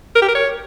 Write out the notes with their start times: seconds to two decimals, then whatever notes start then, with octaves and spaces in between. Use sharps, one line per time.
0.15 A#4
0.22 G4
0.28 A#4
0.35 C#5